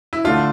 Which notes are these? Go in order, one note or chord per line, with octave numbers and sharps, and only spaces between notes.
E4
D3 A3 D4 F4